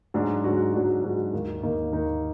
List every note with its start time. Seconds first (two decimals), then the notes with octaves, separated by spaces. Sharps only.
0.14 G#2 F#3 D4 F#4
0.44 G#2 F#3 D4 F#4
0.73 G#2 F#3 D4 F#4
1.04 G#2 F#3 D4 F#4
1.33 D#2 D#3 A#3 D#4
1.63 D#2 D#3 A#3 D#4
1.92 D#2 D#3 A#3 D#4